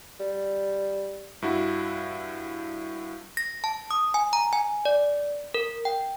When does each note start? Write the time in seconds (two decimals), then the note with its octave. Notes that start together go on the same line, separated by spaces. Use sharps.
0.20 G3
1.42 G2 E4 F#4
3.37 A#6
3.64 A5
3.91 D#6
4.14 G#5
4.33 A#5
4.53 G#5
4.85 D5
5.54 A#4
5.85 G5